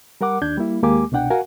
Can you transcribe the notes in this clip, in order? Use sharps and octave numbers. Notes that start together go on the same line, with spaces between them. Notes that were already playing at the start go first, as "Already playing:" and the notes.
G3 A#4 F#5 D6
D#2 D4 G6 G#6
G3 A#3 E4
D#2 G#3 A#3 G4 G#5 D6
C2 B2 D4 F#5 G5
F#4 A#4 F5 F#5 G#5